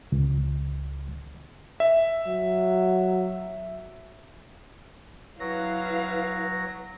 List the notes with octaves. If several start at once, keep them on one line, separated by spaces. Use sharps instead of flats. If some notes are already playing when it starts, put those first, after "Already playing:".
C#2
E5
F#3
F#3 E4 B4 F5 A#6